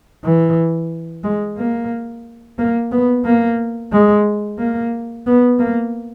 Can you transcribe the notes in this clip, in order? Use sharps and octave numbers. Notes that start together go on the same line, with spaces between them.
E3
G#3
A#3
A#3
B3
A#3
G#3
A#3
B3
A#3